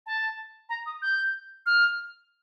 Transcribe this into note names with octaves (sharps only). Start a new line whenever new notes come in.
A5
A#5
D#6
G6
F6